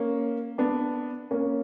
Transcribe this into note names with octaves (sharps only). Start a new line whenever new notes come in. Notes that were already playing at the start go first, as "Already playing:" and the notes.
Already playing: A#3 C#4
B3 D4
A#3 C#4